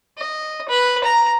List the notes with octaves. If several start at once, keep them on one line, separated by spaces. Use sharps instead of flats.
D#5
B4
A#5